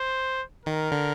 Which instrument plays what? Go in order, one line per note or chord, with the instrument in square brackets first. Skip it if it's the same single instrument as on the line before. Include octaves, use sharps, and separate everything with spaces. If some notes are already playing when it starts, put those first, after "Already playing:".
Already playing: [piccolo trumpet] C5
[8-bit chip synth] D#3 [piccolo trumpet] A#4
[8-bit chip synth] D3